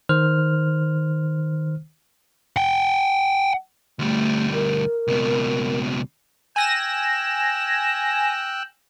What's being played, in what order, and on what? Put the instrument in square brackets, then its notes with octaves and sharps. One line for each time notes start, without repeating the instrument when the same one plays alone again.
[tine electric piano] D#3 C5 F6
[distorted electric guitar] F#5 G5
[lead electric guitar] D2 G3 [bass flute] A3
[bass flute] A#4
[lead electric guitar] C#2 B2
[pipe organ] G5 E6 F#6 [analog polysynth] G#5 A#6 E7